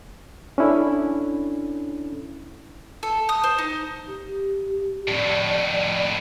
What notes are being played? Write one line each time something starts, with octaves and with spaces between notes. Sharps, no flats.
C#4 D4 E4 A4
A4
D#6
C5
D#4
G4
F2 A2 D5